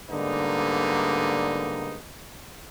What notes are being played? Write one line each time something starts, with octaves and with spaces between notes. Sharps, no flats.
G#2 D3 G3 A#3 B3 D#4